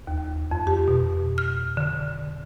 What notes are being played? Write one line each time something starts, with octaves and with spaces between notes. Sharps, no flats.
D#2
F2
G4
B2
F6
D3